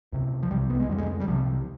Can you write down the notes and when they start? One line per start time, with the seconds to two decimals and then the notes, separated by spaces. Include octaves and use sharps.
0.12 D2 C3
0.43 F3
0.51 C2 C3 G3
0.70 B3
0.79 G#3
0.89 F2 D3 G3
0.98 G#3
1.20 G3
1.27 C2 C3 F3